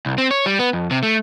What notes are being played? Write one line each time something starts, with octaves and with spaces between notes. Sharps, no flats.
C2
C4
C#5
G3
B3
F2
C3
A3